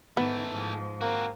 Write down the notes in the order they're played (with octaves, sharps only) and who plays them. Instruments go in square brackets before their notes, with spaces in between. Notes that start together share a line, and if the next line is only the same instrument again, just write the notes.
[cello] G#2 D#3 [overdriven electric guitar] E3 A3 [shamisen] B3
[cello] G#2 F3
[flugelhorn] A#3 [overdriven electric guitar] C4 F#4